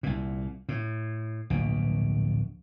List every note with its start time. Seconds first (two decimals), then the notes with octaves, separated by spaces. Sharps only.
0.03 C2 A#2
0.69 A2
1.50 D1 A#1 B2